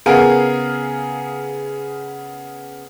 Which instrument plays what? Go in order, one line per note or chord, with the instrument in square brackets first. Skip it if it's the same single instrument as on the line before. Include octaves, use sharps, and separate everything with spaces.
[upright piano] C#3 B3 G#4 A#4 F5 G#5